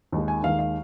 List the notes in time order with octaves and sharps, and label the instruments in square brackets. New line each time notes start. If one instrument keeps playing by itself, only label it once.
[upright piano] D#2 D#3 G#3
G#5
D#2 D#3 G#3 F5
F5